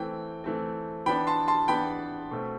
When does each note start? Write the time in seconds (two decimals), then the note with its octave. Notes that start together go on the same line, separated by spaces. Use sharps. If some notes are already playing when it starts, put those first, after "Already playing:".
Already playing: E3 A3 C4 G5
0.44 E3 A3 C4
1.06 E3 B3 D4 G5 B5
1.27 A5 C6
1.48 A5 C6
1.68 E3 B3 D4 G5 B5
2.31 B2 A3 C4